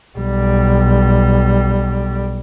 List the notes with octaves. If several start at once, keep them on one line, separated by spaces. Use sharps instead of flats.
B1 G3